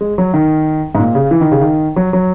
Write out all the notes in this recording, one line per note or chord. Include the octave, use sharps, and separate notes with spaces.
G#3
F#3
D#3
G#2
A#2
C#3
E3
D#3
C#3
D#3
F#3
F#3